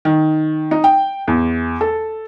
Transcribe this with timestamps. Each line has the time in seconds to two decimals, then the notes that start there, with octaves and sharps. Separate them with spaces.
0.05 D#3
0.71 D#4
0.84 G5
1.28 E2
1.81 A4